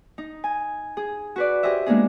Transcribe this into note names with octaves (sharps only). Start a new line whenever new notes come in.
D#4
G#5
G#4
F#4 B4 D5
G4 G#4 C5 D#5 E5
G#3 A#3 B3 D4 D#4 G#4